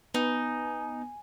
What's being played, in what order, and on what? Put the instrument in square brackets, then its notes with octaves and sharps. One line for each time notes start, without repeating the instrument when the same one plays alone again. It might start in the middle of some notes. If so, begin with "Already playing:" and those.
[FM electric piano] B3 [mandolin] D#4 [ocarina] G#5